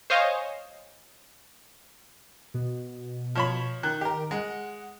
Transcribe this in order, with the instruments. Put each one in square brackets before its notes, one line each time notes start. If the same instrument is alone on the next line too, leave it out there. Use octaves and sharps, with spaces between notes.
[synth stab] C5 C#5 D#5 F5 G#5
[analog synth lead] B2
[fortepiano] F3 C#5 B5
D#3 F#6
[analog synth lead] D#3 [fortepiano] G4 A#4
[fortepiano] G#3 [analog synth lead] F#5